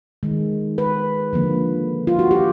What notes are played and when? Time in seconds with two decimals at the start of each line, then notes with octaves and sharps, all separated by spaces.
0.23 D#3 G#3
0.78 B4
1.33 D3 F3 A#3
2.07 F4
2.19 F#4
2.31 G4